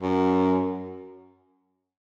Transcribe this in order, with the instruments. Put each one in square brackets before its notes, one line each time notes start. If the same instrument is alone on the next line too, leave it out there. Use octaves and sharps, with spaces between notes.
[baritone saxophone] F#2